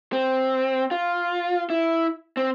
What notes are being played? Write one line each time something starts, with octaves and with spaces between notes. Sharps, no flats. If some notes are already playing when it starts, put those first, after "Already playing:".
C4
F4
E4
C4